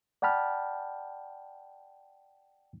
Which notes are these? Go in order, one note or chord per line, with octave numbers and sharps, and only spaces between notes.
D5 F#5 G5 A5 B5 F6